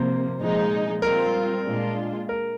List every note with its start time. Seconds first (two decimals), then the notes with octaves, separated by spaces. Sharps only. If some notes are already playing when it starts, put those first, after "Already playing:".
Already playing: C3 F3 A#3 C5
0.39 A#2 F3 G#3 D#4
1.02 G3 C4 F4 A#4
1.65 A#2 G#3 D4 F4
2.29 A#4